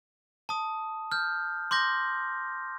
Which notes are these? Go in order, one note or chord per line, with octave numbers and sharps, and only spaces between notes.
A5 D#6
F6 G6
C6 D6 G6 A#6